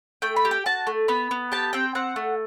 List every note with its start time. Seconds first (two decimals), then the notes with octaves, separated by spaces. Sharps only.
0.22 A3 G5
0.36 B5
0.45 G4
0.51 G5
0.66 F#4 A5
0.87 A3
1.08 B3 B5
1.31 B3
1.52 G4 A5
1.73 C4 G5
1.95 C4 F#5
2.16 A3